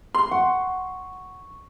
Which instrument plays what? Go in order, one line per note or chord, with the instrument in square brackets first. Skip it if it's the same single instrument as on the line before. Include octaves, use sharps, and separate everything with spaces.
[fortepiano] C6
[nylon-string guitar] F#5 [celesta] C#6